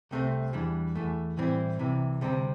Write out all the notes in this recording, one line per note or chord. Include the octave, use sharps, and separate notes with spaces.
C2 C3 A3 C4
E2 E3 G3 D4
E2 E3 A3
A2 E3 G3 C4 E4
C2 C3 E3
D2 C3 G3 C4